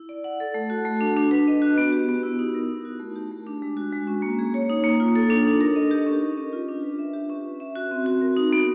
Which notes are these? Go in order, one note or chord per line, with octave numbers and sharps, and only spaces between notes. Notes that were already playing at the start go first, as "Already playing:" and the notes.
Already playing: E4
D5
F#5
A4
A3
F#4
A3
D4
D4
B4
D#5
F#4
B3
G4
B3
E4
D#4
A#4
D#4
F#4
A3
G4
A3
D4
G#3
F#4
G#3
C#4
A#3
G#4
C#5
D#4
A#3
F4
A4
D4
D#4
A#4
D#5
G4
C#4
A#4
D#5
F4
D4
B4
E5
G4
C#4
B4
E5
F#4
C4
F#4
A#4
D#4
B3